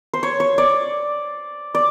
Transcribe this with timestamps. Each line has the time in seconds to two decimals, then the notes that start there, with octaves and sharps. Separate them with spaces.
0.14 C5
0.23 C#5
0.40 C#5
0.58 D5
1.75 D5